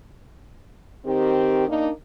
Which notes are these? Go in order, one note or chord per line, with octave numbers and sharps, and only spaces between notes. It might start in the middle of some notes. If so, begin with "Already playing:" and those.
D#3 C4 G4
A#3 D4 D#4